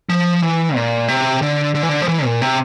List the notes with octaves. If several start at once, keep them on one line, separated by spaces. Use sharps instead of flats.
F3
E3
A#2
C3
D3
D3
E3
D3
F3
E3
A#2
C3